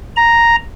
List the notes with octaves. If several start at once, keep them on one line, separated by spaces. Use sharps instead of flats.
A#5